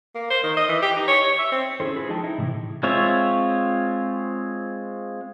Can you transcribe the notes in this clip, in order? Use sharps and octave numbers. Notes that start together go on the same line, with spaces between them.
A#3
C5
D#3
D#5
E3
G4
D#4
C#5
C#5
E5
C4
C#4 D4 E4 G#4 A4 C5
E4 F4 G#4 B4
F3 G#3 D#4 D#5 G5 A5
D#4 E4
A2 C3 E3
G#3 C4 F4 C#5 E5